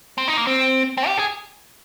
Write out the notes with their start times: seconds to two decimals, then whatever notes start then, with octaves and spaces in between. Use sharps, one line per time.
0.18 C4
0.28 D#4
0.37 A#3
0.47 C4
0.97 C4
1.07 G4
1.18 G#4